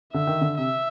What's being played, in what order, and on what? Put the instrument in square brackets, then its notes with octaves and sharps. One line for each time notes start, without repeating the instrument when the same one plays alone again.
[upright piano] D3 [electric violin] E5
[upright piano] D#3
D3
[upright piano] C3 [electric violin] E5